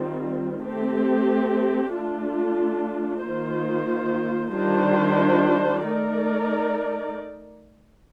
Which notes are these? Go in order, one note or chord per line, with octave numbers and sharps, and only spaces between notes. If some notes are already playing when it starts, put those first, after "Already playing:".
Already playing: D#3 G3 C4 F4
A3 C4 G4
A3 D4 F4
D#3 A#3 F4 C5
D#3 G3 D4 F4 C5
A3 D#4 A#4 D5